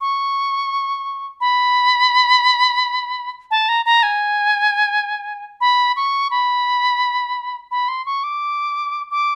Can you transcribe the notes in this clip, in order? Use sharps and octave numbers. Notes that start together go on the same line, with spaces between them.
C#6
B5
A5
A#5
A#5
G#5
B5
C#6
B5
B5
C6
C#6
D6
D6